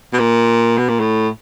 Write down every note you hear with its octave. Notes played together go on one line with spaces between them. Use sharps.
B2
A#2
B2
A#2
A2